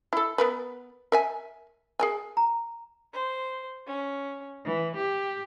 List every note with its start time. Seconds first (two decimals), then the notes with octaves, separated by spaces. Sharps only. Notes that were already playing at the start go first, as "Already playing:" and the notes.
0.13 E4 A4
0.38 B3 A#4 B4
1.12 A#4 E5 G#5
1.99 G#4 A#4 G#5
2.37 A#5
3.12 C5
3.86 C#4
4.63 E3
4.95 G4